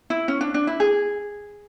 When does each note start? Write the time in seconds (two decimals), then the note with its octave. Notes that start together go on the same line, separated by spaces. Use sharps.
0.10 E4
0.28 C#4
0.41 D4
0.54 D4
0.67 E4
0.80 G#4